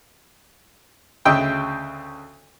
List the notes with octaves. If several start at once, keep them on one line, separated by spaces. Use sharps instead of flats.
D2 C#3 D#5 E5 G5 E6